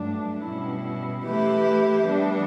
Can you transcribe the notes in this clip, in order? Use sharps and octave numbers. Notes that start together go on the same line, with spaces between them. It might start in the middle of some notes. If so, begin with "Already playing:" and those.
Already playing: G2 F#3 A3 D4
B2 G3 C#4 E4
E3 A3 E4 G4 B4
E3 G3 B3 D4